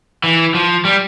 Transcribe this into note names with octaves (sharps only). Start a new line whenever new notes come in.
E3
F3
G3